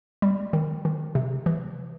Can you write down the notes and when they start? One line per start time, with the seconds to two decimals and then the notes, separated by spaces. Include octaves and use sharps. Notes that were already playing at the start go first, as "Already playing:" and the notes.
0.22 G3
0.53 D#3
0.85 D#3
1.15 C3
1.46 E3